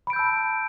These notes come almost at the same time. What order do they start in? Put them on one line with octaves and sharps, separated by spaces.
B5 D7 G6 E6 A5